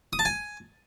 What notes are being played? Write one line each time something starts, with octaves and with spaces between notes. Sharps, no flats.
D#6
A5
G#5